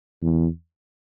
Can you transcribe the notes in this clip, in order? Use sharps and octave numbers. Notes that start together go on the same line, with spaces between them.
E2